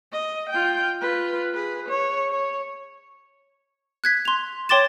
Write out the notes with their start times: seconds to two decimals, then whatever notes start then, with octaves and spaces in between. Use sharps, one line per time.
0.12 D#5
0.50 F4 G5
1.01 F4 B4
1.54 G#4 B4
1.89 C#5
2.30 C#5
4.04 F#6 G#6 B6
4.25 C6 F7
4.69 C#5 G5 C6 D6 A6 E7